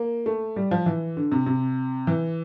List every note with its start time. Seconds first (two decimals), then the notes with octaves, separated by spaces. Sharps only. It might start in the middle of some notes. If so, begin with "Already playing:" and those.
Already playing: A#3
0.26 A3
0.56 G3
0.71 F3
0.86 E3
1.17 D3
1.32 C3
1.46 C3
2.07 E3